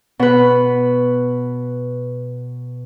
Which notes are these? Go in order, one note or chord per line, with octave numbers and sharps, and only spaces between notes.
B2 B4